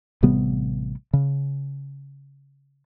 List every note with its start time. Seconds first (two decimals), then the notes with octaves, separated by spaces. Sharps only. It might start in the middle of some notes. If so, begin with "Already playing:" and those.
0.23 A1 C3 G3 B3
1.13 C#3